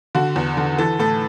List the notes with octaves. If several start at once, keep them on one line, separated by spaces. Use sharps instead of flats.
D3 F#4
E2
D3
E3 A4
A2 A4